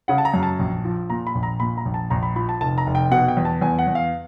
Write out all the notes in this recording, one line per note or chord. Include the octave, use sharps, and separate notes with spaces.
C#3 F#5
A5
A#5
F#2
A5
A#1
F3
A#2 A#5
B5
A#1
A#5
A#2 B5
A#5
A#1
A5
A#1 A#5
B5
F3 B5
A5
F1 A5
A#5
F1
G5
B2 F#5
G5
E2
A5
E2 G#5
F#5
E2
F5